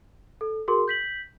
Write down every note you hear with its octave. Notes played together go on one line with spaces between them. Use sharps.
A4
F#4 G#4 A#4 C6
G6 B6 F#7